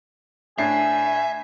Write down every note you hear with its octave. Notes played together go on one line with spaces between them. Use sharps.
A2 D4 E5 G#5 C7